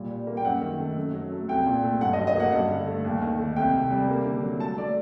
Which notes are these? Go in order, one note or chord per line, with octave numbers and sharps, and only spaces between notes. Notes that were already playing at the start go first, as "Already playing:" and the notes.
Already playing: A#2 G3
G3
A#3
G5
F#2 F#5
D#3
A3
F#2
F#3
A3
C2 G5
A#2
A3
G2 F#5
D#5
F#3
D#5
A#3 F#5
G2 F#5
D3
A3
D#2
D#3
A3
C2 G5
C3
G3
A#3
D3
F#3
A3 A5
A3 D5